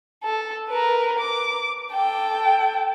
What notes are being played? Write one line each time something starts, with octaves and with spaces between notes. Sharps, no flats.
A4
A#4 B4
D6
A4 G5